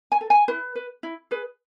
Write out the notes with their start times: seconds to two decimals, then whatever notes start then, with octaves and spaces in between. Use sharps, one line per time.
0.12 G#5
0.21 A4
0.30 G#5
0.48 E4 B4
0.75 B4
1.03 E4
1.31 G#4 B4